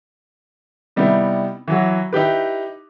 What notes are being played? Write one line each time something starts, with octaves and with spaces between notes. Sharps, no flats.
C3 G3 B3 D#4 E4
E3 F#3 F#4
D#4 E4 G4 B4